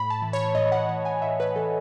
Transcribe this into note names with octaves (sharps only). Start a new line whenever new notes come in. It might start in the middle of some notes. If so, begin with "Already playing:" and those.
Already playing: A2 B5
A5
E3
C#5
A2 D#5
F#5
E3 F#5
G#5
A2 E5
B4
E3 A4